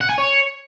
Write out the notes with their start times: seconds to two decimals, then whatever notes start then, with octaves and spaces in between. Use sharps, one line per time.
0.01 F#5
0.09 G#5
0.18 C#5